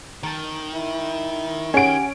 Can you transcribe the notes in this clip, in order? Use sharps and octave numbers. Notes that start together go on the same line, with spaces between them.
D#3 A#4 A5
E4
C#4 G4 G#4 F#5 G#5 D7